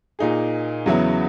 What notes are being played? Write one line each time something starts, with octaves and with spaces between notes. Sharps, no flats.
A#2 A#3 D#4 G#4
E2 C#3 F#3 B3 E4